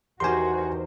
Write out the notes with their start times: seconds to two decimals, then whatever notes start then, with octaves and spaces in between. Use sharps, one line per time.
0.20 E2 D#4 F#4 G4 A#4 C5 G#5 C6